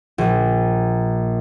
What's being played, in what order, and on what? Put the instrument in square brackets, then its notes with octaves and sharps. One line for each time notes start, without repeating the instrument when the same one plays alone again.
[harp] A#1